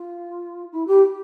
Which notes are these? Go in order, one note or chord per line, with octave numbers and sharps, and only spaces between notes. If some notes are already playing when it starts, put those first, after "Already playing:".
Already playing: F4
E4
G4